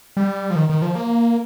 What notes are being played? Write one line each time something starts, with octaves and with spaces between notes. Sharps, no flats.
G3
F3
D#3
D#3
F3
A#3